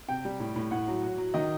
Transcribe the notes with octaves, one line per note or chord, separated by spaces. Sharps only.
C3 G5
G3
A2
A2
A2 F#5
F#3
F#3
F#3
D#3 D#5